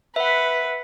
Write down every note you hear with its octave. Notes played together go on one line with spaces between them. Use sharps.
B4 E5 F#5